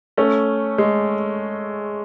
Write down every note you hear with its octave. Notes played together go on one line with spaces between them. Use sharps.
A3 C#4
G#3